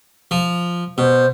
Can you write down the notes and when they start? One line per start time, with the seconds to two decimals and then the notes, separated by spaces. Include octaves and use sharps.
0.31 F3
0.98 B2 C5